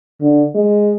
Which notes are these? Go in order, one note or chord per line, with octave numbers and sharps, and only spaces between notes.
D3
G#3